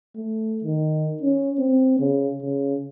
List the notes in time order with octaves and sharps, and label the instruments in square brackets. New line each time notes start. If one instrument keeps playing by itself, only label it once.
[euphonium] A3
D#3
C#4
C4
C#3
C#3